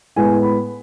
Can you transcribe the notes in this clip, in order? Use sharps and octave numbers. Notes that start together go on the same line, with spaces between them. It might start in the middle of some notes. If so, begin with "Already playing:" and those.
A2 G#3 B3 G#5
B5